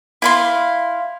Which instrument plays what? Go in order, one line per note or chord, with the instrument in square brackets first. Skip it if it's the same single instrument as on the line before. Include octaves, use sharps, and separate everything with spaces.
[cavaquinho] E4 F5 C6